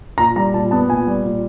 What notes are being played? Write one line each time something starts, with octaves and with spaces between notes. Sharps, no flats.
A#2 A#5
G3 A#5
A#2 A5
B3 A5
A#2 G#5
G3
A#2